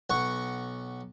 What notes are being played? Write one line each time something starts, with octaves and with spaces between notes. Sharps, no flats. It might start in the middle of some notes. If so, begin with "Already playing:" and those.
B1 F#5 C#6